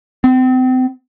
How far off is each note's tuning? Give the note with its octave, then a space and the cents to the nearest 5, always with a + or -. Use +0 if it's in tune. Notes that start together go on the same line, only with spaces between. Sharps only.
C4 -35